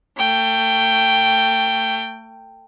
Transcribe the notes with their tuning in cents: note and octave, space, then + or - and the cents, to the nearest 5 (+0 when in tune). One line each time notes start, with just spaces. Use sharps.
A3 +30 G5 +0